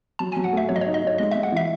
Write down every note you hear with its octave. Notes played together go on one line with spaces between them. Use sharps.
F#3 A5
G#5
F#3
F#5
A3 E5
F#3 C#5
D#5
C#5
D#4
D#5
D#4 C#5
G#3 D#5
E5
G#3
F#5
E3 E5